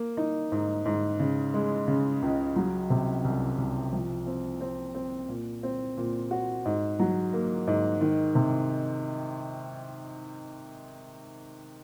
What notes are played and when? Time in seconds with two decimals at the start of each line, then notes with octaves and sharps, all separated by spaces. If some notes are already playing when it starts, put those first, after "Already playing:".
Already playing: A#3
0.17 D#4
0.52 G#2
0.85 G#2
1.20 C#3
1.54 G#3
1.88 C#3
2.22 C#2
2.56 F#3
2.90 C3
3.24 C2
3.58 C2
3.93 F3
4.27 C4
4.60 C4
4.95 C4
5.28 A#2
5.63 C4
5.97 A#2
6.31 F#4
6.65 G#2
6.99 F#3
7.33 A#3
7.67 G#2
8.01 D#3
8.35 C3